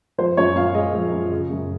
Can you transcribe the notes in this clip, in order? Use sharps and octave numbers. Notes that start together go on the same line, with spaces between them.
F3 C5
F#2 C#5
F#2 F5
G#3 D#5
F3
F#2
C#3
F#2